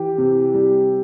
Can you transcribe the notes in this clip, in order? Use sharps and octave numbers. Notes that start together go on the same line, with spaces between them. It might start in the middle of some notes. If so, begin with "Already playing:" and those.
Already playing: E3 G4
C3
G3